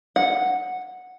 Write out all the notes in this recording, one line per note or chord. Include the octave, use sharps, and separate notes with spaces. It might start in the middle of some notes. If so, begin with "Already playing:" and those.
F#5